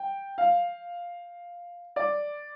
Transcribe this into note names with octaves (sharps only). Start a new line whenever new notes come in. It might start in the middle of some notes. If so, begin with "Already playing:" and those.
Already playing: G5
F5
D5